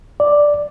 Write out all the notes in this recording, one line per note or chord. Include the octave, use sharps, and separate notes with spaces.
D5